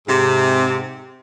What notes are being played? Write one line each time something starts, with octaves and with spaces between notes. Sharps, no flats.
G#2 C3